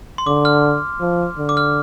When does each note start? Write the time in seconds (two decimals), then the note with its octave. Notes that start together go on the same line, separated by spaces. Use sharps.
0.18 C6
0.27 D3 D6
0.45 F6
1.01 F3
1.38 D3
1.49 D6
1.57 F6